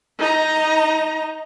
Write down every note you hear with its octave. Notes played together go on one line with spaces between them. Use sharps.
D#4 A#5